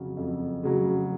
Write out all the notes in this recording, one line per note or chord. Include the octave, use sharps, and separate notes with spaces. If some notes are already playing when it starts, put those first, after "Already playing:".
Already playing: F2 C#3 F#3
F2
C#3 F#3